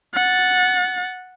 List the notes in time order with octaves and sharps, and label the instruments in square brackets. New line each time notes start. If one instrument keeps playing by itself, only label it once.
[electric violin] F#5 A6